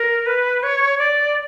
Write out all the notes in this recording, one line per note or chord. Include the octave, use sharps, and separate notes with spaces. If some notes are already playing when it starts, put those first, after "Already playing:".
Already playing: A#4
B4
C#5
D5